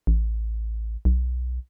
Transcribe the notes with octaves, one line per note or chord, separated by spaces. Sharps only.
A1
B1